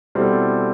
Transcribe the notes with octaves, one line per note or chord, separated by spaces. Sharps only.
B2 G3 C4 E4 A4